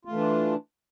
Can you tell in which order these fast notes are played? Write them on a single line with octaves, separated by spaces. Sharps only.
F4 A3 E3 D4